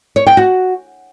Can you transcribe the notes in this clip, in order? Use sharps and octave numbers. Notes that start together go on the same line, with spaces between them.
C#5
G5
F#4